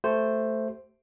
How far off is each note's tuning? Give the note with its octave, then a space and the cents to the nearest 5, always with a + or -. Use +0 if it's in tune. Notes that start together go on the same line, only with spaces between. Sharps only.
A3 +0 G4 -40 C5 +0